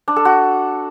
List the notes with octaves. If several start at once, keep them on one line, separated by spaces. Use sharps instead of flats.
D4
A4
F#4